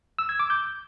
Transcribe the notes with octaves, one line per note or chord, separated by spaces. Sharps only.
E6
G#6
D6
G6